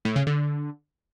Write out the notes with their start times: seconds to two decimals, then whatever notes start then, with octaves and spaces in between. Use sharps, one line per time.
0.05 A2
0.16 C#3
0.27 D3